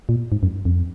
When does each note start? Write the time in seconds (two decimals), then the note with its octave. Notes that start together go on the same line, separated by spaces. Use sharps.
0.09 A#2
0.32 G#2
0.43 F#2
0.65 F2